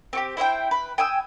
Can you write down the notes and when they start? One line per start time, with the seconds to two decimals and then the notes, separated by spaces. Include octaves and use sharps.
0.13 C4 F#4 G4
0.37 E4 C5 E5 G5
0.71 B4
0.98 G5 G#5 D#6 E6